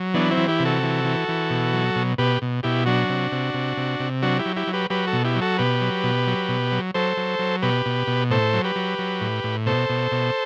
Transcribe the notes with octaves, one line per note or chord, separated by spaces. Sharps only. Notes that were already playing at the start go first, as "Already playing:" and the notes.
Already playing: F#3
E3 B3 D4
C4 E4
E3
E4 G4
C3
F#4 A4
E3
E3
E3
B2
F#3
B2
B2 G4 B4
B2
B2 E4 G4
F#3 D4 F#4
C3
C3
C3
C3
C3
F#3 D4 F#4
E4 G4
F#3
E4 G4
F#3
G4 B4
F#3 G4 B4
F#4 A4
B2
E4 G4
F#3
F#4 A4
B2 G4 B4
F#3
B2
F#3
B2
F#3
F#3 A4 C5
F#3
F#3
B2 G4 B4
B2
B2
A2 A4 C5
F#3
G4 B4
F#3
F#3
A2
A2
B2 A4 C5
B2
B2